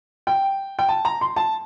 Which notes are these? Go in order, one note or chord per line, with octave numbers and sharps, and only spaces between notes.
G5
G5
A5
A#5
C6
A5